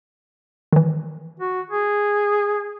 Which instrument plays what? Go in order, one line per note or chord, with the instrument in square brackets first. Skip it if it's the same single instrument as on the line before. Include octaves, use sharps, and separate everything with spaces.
[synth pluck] D#3 E3
[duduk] F#4
G#4